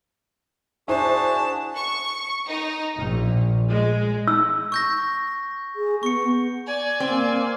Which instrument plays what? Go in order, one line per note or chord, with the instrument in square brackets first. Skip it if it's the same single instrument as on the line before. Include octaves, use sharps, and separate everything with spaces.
[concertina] D4 F#4 G#4 [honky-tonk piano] E4 C5 [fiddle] A5
[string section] C#6
D#4
A#1
G#3
[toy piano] E6
[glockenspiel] C#6 G6 A#6
[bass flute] G#4
[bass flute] B3 [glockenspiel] C#6 C#7
[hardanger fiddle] D5 [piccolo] G#5
[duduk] A#3 [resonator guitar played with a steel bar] C4